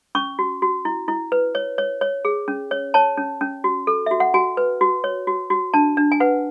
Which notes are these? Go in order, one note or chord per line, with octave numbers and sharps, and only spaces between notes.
C#4 C#6
F#4
F#4
E4
E4
B4
C#5
C#5
C#5
G#4
C#4
C#5
C#5 A5
C#4
C#4
F#4
A4
F#4 E5
F#5
F#4 G#5
B4
F#4
C#5
F#4
F#4
D4 A5
D4
G#5
B4 F#5